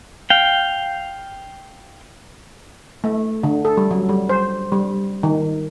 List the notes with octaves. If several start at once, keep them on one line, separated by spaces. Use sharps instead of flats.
F5 G5
A3
D3
A4
G3
F#3
G3
C5
G3
D#3